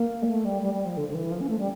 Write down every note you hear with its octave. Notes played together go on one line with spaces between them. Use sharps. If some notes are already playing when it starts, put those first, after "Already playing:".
Already playing: A#3
G3
A3
G3
G3
G3
F3
D3
D3
E3
F3
C#4
A3
G3